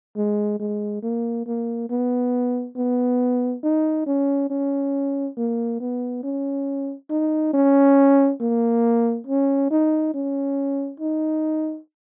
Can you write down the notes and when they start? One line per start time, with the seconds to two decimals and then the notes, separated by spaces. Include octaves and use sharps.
0.17 G#3
0.60 G#3
1.03 A#3
1.47 A#3
1.90 B3
2.77 B3
3.64 D#4
4.07 C#4
4.50 C#4
5.37 A#3
5.81 B3
6.23 C#4
7.10 D#4
7.54 C#4
8.41 A#3
9.27 C#4
9.71 D#4
10.15 C#4
11.00 D#4